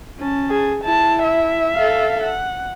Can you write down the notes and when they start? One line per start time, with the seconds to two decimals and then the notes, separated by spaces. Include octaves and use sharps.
0.18 C#4 A5
0.50 G#4
0.84 E4 A5
1.24 E5
1.74 A4 F5
2.23 F#5